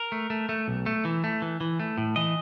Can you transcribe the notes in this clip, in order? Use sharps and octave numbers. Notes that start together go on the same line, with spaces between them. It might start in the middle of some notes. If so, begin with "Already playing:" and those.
Already playing: A#4
A3
A3
A3
B1
A3
E3
A3
E3
E3
A3
A2
E3 D#5